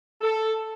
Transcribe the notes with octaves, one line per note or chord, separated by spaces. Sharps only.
A4